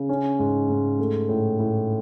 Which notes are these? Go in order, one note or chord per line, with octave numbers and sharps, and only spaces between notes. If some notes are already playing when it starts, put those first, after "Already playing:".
Already playing: C#3
C#4
G#2
G#2
A3
A2
A2